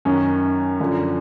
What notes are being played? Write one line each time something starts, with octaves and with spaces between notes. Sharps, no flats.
F#2 D#3 C#4
F#2 D3 F3